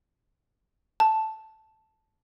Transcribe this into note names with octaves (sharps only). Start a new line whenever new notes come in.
A5